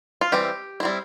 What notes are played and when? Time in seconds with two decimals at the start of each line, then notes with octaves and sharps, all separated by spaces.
0.21 F4
0.32 E3 G3 C4 G4
0.80 G3 C4 E4